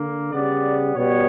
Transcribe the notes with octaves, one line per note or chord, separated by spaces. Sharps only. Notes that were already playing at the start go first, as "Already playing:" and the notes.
Already playing: D3 A#3
C#3 G3 B3 D5
B2 G3 B3 C#5